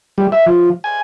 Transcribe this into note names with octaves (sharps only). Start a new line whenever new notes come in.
G3
E5
F3
G#5